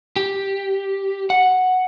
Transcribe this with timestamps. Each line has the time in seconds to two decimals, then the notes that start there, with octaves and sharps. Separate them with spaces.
0.16 G4
1.30 F#5